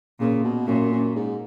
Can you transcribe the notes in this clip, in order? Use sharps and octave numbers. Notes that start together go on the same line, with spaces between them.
A#2 C#3
B2
F#2 A#2
F#2
G#2